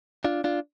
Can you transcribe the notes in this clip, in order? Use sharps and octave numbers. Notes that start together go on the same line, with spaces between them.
D4 F4
D4 F4